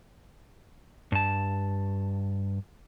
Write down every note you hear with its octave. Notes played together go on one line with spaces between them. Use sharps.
G2 A5